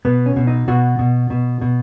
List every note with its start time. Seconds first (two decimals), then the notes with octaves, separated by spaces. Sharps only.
0.05 B2 B3
0.26 C#4
0.36 B2
0.47 D#4
0.68 B2 F#4
0.99 B2
1.30 B2
1.61 B2